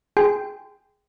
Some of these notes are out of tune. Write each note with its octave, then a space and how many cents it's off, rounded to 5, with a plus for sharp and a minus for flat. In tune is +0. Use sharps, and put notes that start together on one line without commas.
G#4 +0 G5 +0 C6 -20